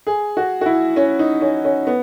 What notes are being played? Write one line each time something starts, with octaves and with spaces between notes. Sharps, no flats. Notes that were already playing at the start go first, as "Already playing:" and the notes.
G#4
F#4
F#4
E4
C#4
D#4
C#4
C#4
B3